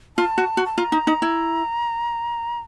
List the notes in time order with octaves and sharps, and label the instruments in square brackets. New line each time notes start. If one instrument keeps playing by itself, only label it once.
[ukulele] F4 [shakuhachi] A5
[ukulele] F#4
F#4
[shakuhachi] A5
[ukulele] F4 [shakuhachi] A#5
[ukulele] D#4
D#4
E4